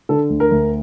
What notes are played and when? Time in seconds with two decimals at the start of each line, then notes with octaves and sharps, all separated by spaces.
0.09 D3 A4
0.29 D2
0.40 A#4
0.51 D2